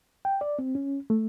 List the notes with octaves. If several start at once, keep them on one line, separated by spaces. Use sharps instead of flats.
G5
D5
C4
C#4
A3